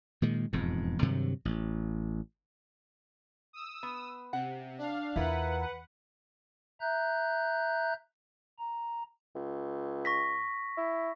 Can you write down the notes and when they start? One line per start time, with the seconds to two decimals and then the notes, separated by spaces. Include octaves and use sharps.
0.22 A#2 D#3 G#3
0.53 E1 F2 G#2
1.02 G2 C3 D#3 F#3
1.45 A1
3.53 D#6 E6
3.83 B3
4.33 C3 F#5
4.78 D4 F5
5.16 E2 E4 F4 A#4 B4 F#5
6.81 E5 A#5 F#6 G6
8.59 A#5
9.36 C#2
10.05 C#6 A#6 B6
10.77 E4